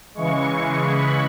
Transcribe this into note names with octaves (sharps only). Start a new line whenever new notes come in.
C#3 E3 G#3 C#6
C#6
B5